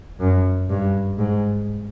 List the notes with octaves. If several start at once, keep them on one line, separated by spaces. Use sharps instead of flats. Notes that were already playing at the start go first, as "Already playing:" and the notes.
F#2
G2
G#2